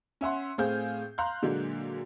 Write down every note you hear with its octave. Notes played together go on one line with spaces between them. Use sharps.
C#4 E5 F#5 C6
A2 C4 G#4 F5 G6
F5 A#5 C6 F#6 G6
A#2 D3 F#3 G#3 A#3